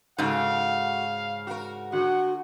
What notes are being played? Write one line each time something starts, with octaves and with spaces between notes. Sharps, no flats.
G#2 C#3 F#4 A4 F5
F#4 A#4
D3 F#4 F#5